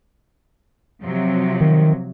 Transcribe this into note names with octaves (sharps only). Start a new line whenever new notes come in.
C3 F3 F#3
D#3